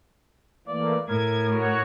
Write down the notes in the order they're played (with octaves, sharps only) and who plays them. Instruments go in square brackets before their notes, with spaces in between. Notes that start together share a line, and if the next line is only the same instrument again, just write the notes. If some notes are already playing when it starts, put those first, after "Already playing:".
[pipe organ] E3 A3 A#3 [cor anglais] D5
[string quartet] A2 [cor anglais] A#4 [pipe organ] G#6
[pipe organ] F#4 C#5